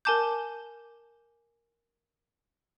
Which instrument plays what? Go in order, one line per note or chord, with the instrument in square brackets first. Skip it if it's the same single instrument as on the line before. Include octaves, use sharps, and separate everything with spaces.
[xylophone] A#4 G#5 A5 D6 G6